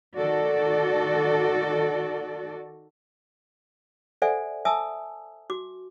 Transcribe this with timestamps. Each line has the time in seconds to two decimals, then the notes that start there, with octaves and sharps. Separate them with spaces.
0.17 D#3 F#4 A4 D5
4.22 A4 C5 D5 E5 F#5 G#5
4.65 E5 G#5 A5 D#6 E6
5.50 F#4 D6